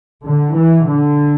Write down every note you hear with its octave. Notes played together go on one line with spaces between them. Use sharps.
D3
E3
D3